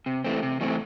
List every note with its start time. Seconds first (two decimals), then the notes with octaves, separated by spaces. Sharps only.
0.06 C3
0.24 E3 A3 C4
0.43 C3
0.61 E3 A3 C4